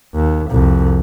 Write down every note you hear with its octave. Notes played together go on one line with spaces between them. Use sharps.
D#2
C2 F2